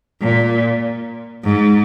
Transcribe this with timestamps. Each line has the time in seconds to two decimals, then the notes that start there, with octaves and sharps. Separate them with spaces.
0.22 A#2
1.44 G#2